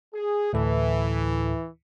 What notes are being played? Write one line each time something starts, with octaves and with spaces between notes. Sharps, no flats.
G#4
D2 A2 E3 A4